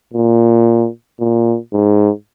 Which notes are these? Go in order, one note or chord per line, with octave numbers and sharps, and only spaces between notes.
A#2
A#2
G#2